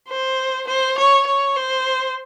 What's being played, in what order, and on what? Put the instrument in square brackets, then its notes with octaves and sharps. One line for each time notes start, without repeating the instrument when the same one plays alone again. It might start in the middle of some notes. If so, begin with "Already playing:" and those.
[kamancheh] C5
C5
C#5
C#5
C5